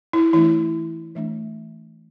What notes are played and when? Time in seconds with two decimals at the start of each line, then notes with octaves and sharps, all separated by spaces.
0.13 E4
0.33 E3 A3 D4 E4
1.15 E3 A3 D4